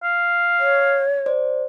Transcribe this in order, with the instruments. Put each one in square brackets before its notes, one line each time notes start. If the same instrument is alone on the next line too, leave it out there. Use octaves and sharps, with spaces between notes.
[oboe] F5
[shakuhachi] C#5
[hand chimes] C5 D5